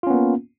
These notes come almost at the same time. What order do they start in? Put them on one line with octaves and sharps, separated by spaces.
F4 C#4 B3 A#3